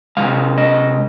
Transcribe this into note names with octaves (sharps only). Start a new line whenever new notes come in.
C3 D#3 G#3 F5
D#5